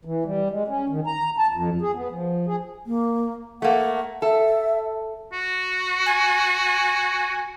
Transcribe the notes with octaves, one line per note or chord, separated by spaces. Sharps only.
E3
G3
G#3
C#4
D#3
A#5
A5
F2
G#4
B3
F3
G#4
A#3
A3 A#3 F#5
A4 E5
F#4
G#5